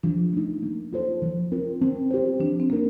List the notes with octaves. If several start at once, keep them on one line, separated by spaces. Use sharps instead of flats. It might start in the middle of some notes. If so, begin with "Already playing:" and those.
F3 D4
A3 D#4
A#3
F4 A4 C5
F3
C4 F4 A#4
C4
G4 C5
F3 D4
C4
A#3 C4 D#4 A#4